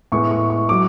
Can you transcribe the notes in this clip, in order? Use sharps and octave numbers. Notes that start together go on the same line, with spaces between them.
A2 G#3 B3 C#6
C#6
C#6
F#3 D6